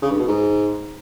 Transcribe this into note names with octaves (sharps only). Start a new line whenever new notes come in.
C#3
G2
B2
G#2